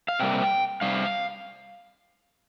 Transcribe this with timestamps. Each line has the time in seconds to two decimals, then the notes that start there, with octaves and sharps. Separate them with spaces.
0.08 F5
0.20 C3 G3 A#3 G5
0.81 C3 G3 F5